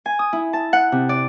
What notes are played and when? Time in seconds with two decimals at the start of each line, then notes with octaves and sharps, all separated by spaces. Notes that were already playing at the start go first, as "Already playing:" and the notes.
0.06 G#5
0.19 D#6
0.33 E4
0.53 A5
0.73 F#5
0.92 C3
1.09 D5